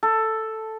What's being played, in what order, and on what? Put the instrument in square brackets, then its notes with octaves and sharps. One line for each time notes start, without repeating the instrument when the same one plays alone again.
[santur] A4